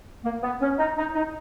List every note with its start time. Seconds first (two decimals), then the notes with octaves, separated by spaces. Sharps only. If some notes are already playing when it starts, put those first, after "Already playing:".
0.25 A#3
0.43 B3
0.62 C#4
0.79 D#4
0.98 D#4
1.15 D#4